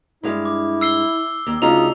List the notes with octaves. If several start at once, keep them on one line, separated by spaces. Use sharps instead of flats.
G2 G#3 E4 F5
D6
E6 C7 G7
D#2
D2 C#3 D#4 F4 F7